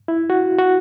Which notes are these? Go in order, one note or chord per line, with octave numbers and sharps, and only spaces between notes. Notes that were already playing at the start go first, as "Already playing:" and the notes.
E4
F#4
F#4